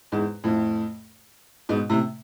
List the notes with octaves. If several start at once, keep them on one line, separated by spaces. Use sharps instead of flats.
E2 G#2
F2 A2
G#2 B2
A2 C3